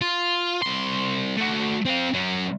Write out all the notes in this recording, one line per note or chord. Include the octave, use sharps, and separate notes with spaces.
F4
C2 C6
A3 F#4
C4 F5
F#3 C#4